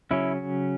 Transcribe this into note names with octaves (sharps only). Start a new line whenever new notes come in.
C#3 F#3 C#4 E4